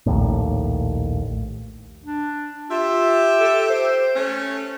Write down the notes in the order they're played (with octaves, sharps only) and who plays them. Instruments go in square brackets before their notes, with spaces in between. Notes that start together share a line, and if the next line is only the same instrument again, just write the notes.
[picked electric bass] A#1 D#2 A2
[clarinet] D4
[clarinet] F4 [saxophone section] G4 E5
[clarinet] A4
C5
[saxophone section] A3 C#4